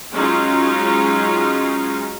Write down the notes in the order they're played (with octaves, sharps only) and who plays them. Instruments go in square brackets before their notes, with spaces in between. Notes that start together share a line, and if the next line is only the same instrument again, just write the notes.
[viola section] F#3 G#3 C#4 D#4 F4